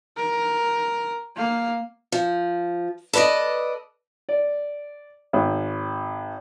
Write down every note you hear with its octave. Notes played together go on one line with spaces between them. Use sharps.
A#4
A#3 F5
F3
A4 B4 C5 D5 D#5
D5
G#1